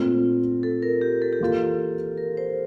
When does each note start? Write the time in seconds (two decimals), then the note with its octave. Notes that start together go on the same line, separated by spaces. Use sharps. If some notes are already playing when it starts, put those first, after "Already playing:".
Already playing: A#2 A3 C4 F4
0.63 A4
0.83 A#4
1.01 G4
1.22 A4
1.33 G4
1.40 E3 A#3 F4 A4
2.18 A#4
2.37 C5